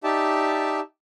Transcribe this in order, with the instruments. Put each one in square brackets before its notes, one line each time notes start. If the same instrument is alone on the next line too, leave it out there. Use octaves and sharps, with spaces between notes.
[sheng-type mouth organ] D#4 G4 D5 E5 A5